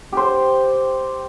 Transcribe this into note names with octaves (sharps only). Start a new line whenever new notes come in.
G4 C5